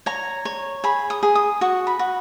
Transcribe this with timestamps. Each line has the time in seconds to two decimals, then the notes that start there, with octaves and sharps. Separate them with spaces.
0.06 C#5 A#5
0.45 C#5
0.84 G#4 B5
1.10 D#6
1.23 G#4
1.35 D#6
1.61 F#4 C#6
1.87 B5
1.99 F#4